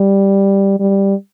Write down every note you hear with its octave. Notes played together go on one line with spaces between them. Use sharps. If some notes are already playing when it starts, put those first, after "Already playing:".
Already playing: G3
G3